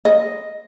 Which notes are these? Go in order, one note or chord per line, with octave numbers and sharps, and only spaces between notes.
D#5